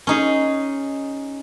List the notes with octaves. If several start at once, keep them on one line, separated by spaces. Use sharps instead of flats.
C#4 D#4 G#4